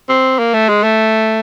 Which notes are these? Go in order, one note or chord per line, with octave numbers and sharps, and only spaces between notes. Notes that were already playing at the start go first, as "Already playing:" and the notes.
C4
A#3
A3
G#3
A3